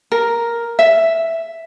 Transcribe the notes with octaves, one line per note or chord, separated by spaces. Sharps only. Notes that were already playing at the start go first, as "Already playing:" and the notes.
A#4
E5